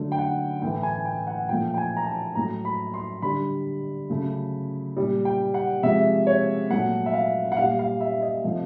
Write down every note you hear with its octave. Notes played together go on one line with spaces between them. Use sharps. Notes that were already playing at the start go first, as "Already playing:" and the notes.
Already playing: D3 F#3 A3
G5
F#5
A2 E3 A3 G5
G#5
G5
F#5
A#2 F3 A3 G5
G5
G#5
A#5
A5
A2 F#3 A3 A#5
B5
C6
D3 G3 B5
C#3 F#3 A3
A#2 G3
G5
F#5
C3 F3 G#3 E5
C#5
A#2 F#3 A3 F#5
E5
F5
F#5
A#2 G3 F5
F5
E5
D#5
C3 F3 A3